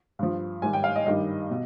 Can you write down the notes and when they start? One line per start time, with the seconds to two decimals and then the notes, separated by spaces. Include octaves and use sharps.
0.19 G2 F3
0.62 G#2 D#3 G3 G#5
0.73 G5
0.84 F5
0.96 D#5
1.06 G2 D#3 G3 D#5
1.50 B2